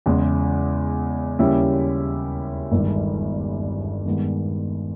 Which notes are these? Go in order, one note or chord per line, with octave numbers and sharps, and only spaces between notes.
E2 C#3 G#3
D#2 C#3 G3 C#4 E4
G1 G2 D#3 G#3
G2 D#3 G#3 B3